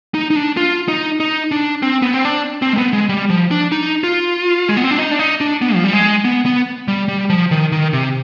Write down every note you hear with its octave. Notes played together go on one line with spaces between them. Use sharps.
D#4
D#4
D4
F4
D#4
D#4
D4
C4
B3
C4
D4
C4
G#3
B3
G#3
G3
F3
D4
D#4
F4
G#3
B3
C4
D4
D#4
D4
D#4
D4
B3
F3
G3
G#3
B3
B3
G3
G3
F3
D#3
D#3
C3